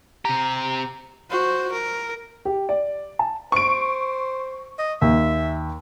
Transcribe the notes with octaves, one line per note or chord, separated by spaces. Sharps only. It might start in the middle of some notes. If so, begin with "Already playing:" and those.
C3 G4 A#5
F#4 C5
A#4
G4
D5
A5
C5 C#6 D7
D#5
D#2 E5